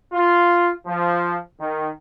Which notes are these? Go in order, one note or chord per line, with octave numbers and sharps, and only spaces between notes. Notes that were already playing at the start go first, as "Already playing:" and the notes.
F4
F3
D#3